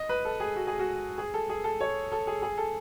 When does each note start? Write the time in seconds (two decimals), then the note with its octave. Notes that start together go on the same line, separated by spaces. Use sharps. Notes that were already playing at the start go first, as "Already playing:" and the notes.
Already playing: D#5
0.09 B4
0.25 A4
0.40 G#4
0.56 F#4
0.67 G#4
0.79 F#4
1.18 G#4
1.34 A4
1.49 G#4
1.64 A4
1.81 C#5
2.12 A4
2.27 G#4
2.42 G#4
2.58 A4